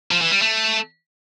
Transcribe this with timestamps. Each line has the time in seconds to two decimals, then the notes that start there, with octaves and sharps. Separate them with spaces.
0.11 F3
0.21 E3
0.32 G3
0.42 A3